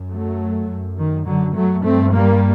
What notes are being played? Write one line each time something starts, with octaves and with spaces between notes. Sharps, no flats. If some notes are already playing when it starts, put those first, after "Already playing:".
Already playing: F#2
F#3 A3
F#2
D#3
D3 F#3
F#3 A3
G2 A3 C4
G3 A#3